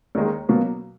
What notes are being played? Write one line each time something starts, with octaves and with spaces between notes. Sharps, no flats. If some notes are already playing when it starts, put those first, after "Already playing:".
D#2 D#3 G#3
B2 F#3 A#3